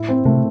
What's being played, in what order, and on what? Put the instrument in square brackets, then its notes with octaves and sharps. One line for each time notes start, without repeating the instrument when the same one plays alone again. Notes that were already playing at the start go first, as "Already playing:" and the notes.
Already playing: [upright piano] A2 E4
C4
[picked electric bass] C3 [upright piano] A3